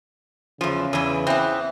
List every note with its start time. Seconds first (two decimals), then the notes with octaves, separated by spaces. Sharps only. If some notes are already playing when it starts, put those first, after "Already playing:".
0.61 E2 C#3 F3
0.93 E2 E3
1.27 E3 B3 C4